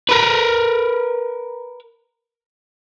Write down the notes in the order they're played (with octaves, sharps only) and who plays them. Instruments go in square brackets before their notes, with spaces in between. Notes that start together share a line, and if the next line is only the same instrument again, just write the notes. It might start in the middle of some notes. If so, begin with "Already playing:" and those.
[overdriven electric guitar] A#4 B4